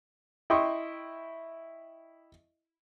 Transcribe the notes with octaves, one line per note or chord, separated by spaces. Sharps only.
E4 D#5 G5 C6 C#6